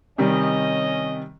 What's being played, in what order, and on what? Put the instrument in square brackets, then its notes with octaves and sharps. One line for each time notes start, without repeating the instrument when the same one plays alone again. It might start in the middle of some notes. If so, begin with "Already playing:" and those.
[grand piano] C3 D#3 G3 [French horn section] C#4 D#5